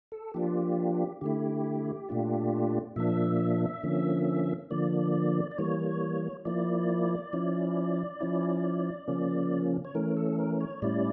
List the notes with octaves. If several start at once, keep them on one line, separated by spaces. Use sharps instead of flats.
A4
F3 A#3 D4 F4 G4
D3 A3 E4 G4
A#2 A3 D4 F4
A#2 F3 A#3 D4 E5
D3 F3 A#3 C#4
D3 F3 A#3 D5
D5
E3 G3 A#3 C#5
F3 A#3 E4 D5
F3 C#4 E4
F3 C#4 E4
C#3 F3 A#3 C#4
C#5
E3 A3 C#4 A#4
A4
A#4
C#5
A2 G3 C#4 E4 D5